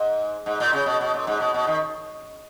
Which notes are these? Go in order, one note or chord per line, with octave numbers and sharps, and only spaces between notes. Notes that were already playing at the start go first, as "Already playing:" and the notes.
Already playing: G#2
G#2
A#2
C#3
B2
B2
A#2
G#2
B2
B2
D#3